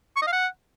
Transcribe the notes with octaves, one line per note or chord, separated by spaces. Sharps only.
C#6
D#5
F5
F#5